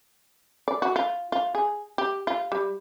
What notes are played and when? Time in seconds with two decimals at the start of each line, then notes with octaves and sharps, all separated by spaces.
0.68 D5
0.82 F#4
0.96 F4
1.32 F4
1.55 G#4
1.98 G4
2.27 F4
2.52 G3